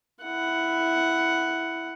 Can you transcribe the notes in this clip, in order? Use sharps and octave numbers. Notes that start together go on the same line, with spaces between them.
E4 F#5